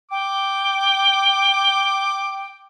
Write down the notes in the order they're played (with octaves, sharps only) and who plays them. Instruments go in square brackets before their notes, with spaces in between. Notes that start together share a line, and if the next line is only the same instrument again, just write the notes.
[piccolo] G5 [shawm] D6